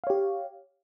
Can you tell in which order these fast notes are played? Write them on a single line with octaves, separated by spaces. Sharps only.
F5 C#5 G4